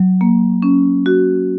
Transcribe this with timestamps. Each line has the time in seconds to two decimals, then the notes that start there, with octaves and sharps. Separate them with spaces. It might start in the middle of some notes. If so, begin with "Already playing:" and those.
Already playing: F#3
0.21 A#3
0.62 C#4
1.06 F#4